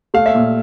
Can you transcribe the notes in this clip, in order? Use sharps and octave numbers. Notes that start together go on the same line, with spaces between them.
A3 F5
E5
A#2